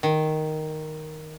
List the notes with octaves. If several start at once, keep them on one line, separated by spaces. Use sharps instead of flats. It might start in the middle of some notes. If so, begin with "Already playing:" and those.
D#3